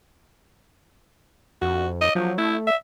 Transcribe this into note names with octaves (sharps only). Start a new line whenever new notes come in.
F2 F#4
D#5
F3 F#3
A3 E4
E5